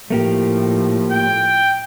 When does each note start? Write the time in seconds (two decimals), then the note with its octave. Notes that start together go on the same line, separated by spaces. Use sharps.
0.10 A2 F3 A3 A#3 G4
1.11 G5